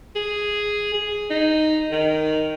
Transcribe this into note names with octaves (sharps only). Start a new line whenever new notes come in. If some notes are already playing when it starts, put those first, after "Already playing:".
G#4
G#4
D#4
D#3